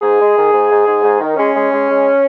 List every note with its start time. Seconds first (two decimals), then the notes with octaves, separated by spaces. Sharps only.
0.01 G#2 G#4
0.19 G#3
0.36 D#3
0.52 G#2
0.70 G#2
0.86 G#2
1.03 G#2
1.20 D#3
1.36 G#3 C#4
1.54 G#3
1.70 G#3
1.87 G#3